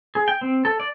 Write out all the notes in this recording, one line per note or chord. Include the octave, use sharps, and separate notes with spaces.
G#4
G5
C4
A4
D5